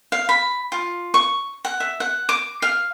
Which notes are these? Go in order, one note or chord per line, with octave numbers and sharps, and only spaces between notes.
F5
B5
F4
C#6
F#5
E5
F#5
D6
F5